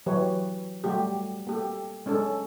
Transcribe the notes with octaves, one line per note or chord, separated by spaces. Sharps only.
E3 F#3 G4 B4 C#5
G3 A3 F#4 G4
A#3 G4 A4
G#3 C#4 D4 A4